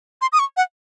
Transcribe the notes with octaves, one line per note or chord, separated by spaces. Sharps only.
C6
D#6
C#6
F#5